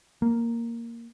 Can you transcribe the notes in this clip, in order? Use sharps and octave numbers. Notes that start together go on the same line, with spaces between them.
A#3